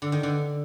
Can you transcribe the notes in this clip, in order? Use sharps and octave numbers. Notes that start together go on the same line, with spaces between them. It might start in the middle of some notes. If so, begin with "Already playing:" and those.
D3
D#3
D3